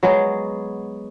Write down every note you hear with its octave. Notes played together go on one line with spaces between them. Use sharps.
F#3 G#3 B3 G#4